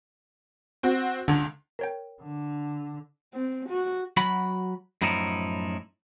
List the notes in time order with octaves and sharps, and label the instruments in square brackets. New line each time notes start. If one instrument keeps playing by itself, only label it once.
[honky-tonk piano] C4 F#4
[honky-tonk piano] C#2 F7 [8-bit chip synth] D3
[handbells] A#4 C#5 G5
[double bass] D3
[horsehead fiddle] C4
F#4
[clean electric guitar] F#3 F#4 B5
F#2 A2 F3 D#4 E4